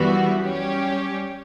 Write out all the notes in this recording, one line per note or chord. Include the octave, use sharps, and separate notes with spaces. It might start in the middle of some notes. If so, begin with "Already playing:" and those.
Already playing: F#2 E3 G3 B3 F#4
G3 C#4 G4 C#5